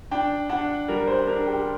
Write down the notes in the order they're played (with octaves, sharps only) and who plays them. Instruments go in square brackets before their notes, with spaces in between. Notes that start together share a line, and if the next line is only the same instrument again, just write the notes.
[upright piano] D4 [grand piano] G5
[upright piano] D4 [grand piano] F#5
[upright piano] G3 [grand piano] A#4
[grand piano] C5
[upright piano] D4 [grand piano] A#4
[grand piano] G4